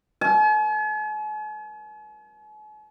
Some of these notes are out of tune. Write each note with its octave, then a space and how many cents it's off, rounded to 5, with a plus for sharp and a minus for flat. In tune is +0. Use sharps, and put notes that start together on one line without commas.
G#5 +45